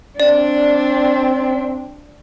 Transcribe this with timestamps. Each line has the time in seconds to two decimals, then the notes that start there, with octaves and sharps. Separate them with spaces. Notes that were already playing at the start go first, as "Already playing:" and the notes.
0.20 C4 D4 D5